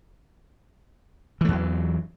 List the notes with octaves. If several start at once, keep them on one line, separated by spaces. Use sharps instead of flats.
E2 E3 F#3 A3